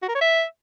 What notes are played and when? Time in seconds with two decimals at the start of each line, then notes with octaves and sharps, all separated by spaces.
0.02 F#4
0.09 A#4
0.15 C#5
0.21 E5